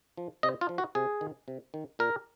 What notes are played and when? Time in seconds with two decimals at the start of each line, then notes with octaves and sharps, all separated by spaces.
0.17 F3
0.43 C3 D#5
0.61 F4
0.69 F3
0.78 F#4
0.95 C3 G#4
1.21 D#3
1.48 C3
1.74 D#3
1.99 A#2 A#4